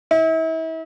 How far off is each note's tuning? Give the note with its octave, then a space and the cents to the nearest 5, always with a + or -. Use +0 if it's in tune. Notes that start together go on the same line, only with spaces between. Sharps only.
E4 -35